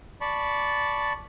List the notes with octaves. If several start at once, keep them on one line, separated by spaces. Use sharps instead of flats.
D5 A5 B5 C#6